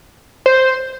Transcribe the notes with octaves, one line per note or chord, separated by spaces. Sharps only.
C5